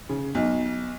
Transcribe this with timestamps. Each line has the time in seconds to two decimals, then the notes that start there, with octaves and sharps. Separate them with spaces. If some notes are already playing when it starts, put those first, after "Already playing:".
0.09 C#3
0.35 B1